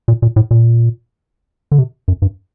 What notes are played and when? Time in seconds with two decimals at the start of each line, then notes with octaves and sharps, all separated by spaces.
0.08 A#2
0.22 A#2
0.36 A2
0.51 A#2
1.72 D3
1.78 C3
2.08 F#2
2.22 G2